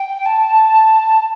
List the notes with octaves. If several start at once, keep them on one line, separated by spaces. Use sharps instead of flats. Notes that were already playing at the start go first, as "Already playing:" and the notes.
Already playing: G5
A5